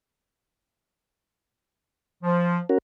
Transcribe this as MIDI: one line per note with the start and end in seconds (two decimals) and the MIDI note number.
2.23 2.59 53
2.69 2.78 61
2.69 2.78 66
2.69 2.78 70